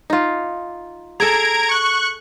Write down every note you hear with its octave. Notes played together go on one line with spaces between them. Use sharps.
D#4 F4
G#4 A4 A#5 G#6 D7
C#6 F#6